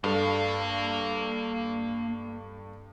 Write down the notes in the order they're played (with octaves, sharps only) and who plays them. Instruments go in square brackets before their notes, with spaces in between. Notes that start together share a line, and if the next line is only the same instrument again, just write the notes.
[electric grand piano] G2 A4 [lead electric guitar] A#3 F5